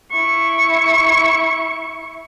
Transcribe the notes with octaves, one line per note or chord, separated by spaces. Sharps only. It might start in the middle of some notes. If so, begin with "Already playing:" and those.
E4 C#6